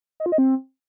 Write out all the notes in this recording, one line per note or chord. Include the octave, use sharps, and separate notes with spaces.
D#5
F4
D#5
C4